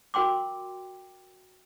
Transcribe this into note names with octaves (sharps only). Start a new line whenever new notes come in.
F#4 A#4 G5 C6 D6